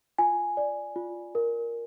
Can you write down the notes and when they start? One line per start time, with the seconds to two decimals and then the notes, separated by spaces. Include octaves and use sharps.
0.19 F4 G#5
0.57 D5
0.96 F4
1.35 A#4